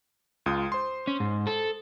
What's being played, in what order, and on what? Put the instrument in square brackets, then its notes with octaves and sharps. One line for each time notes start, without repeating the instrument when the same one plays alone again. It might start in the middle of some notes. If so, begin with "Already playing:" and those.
[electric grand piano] C#2 F4 D#6
C5 C6
[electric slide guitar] C#4
G#2
A4